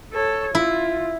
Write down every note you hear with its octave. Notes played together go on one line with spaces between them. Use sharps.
A4 C#5
E4 F4